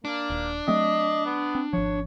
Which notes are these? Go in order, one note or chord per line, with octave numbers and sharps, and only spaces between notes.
A#3 D4
D#1
F#3 A3 C4 D#5
B3
C4
G#1 F3 C#5